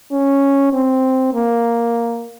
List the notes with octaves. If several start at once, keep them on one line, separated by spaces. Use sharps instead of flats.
C#4
C4
A#3